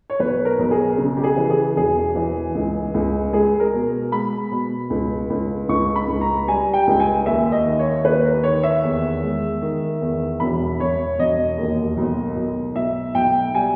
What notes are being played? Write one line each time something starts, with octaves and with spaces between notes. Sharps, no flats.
C#5
B1 B4
A#4
B1
G#4
C#3
G4
G#4
E3
G#4
E1 G#4
E3
C#2
C#2
G#3 G#4
A#4
B2
G#3 B5
B2
C#2
C#2
C#2 C#6
B5
C#2
A#5
G3 G#5
G5
C#2
G#5
D#2 E5
D#5
D#3
C#5
D#2 B4
A#4
D#3 C#5
E5
E2
G#3
D#3
E2
E1 B5
E1 C#5
E1 D#5
D#2
B1
B1
B1 E5
B1 G5
G3 G#5